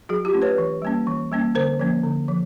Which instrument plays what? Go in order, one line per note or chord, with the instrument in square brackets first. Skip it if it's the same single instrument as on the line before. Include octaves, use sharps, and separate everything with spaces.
[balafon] F#3 F#4 G#4
F4 G4
A3 C#4
B4 C#5
E3
G3 A#3 C#4
E3
G3 A#3 C#4
D3 A#4 C5
F3 A#3 C#4
D3
F3